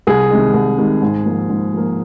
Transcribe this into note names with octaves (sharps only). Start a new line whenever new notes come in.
C2 G#4
C3 D#3 G#3
C2
C3 D#3 G#3
G#2
F3 A#3
G#2
F3 A#3